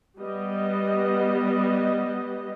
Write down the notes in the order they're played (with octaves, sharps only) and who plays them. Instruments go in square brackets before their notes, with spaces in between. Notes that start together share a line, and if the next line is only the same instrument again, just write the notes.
[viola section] G3 B3 D#5